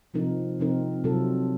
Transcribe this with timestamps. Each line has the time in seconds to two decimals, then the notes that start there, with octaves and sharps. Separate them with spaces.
0.14 C3 F3 C4 D#4 A#4
0.59 C3 F3 C4 D#4 A#4
1.04 C3 F#3 C4 F4 A4